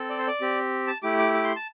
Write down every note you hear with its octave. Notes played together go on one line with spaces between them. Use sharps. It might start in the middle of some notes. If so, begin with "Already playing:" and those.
Already playing: C4 A4
D5
C5
D5
C4 G4
A5
A3 E4 G4 D6
D6
D6
C6
A5